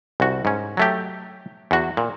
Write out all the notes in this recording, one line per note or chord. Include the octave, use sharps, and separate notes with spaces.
C2 F#4
G#2 C#4
F#3 A3 G4
E2 F#4
A#2